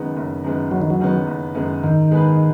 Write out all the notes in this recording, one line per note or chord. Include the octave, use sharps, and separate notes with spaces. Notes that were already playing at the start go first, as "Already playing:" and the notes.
Already playing: F#1 F#2 D#3 G#3 B3
F#1
F#2 D#3 G#3 B3
F#1 F#3
D#3
F#3
F#2 D#3 G#3 B3
F#1
F#2 D#3 G#3 B3
G#2 D#3
G#3 B3 G#4 B4